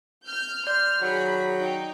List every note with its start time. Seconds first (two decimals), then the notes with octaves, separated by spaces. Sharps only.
0.25 F6 G6
0.67 D5 C6 F6 G6
1.01 D#3 F#3 G#4 B5
1.59 D#4 G5